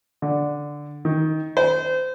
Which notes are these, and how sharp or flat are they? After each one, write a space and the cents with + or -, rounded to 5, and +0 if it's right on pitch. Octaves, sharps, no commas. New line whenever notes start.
D3 -5
D#3 +15
C5 -30